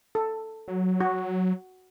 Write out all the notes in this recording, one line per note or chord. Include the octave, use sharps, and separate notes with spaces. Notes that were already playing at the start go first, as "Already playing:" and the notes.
A4
F#3
F#4